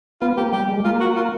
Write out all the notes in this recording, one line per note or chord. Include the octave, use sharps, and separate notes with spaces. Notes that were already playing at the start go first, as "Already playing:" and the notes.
B3 F4
A#3 G4
G3 G4
G#3
A#3 F4
F#4
F4